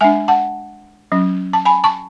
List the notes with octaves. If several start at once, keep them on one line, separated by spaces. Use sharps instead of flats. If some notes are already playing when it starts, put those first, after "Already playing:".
G#3 D4 E5 G#5
F#5 A5
F#3 C#4
A5
G#5 B5
A5 C#6